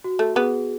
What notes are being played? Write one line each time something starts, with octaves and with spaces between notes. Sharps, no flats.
F#4
A3
B3 G#4